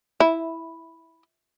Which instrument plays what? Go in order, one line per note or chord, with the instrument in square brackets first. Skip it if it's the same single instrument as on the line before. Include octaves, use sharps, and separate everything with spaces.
[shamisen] E4